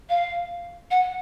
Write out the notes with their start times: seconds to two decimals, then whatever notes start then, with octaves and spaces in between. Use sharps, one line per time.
0.09 F5
0.90 F#5